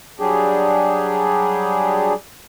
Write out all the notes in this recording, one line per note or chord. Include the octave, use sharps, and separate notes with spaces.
F#3 G3 D4 G4 G#4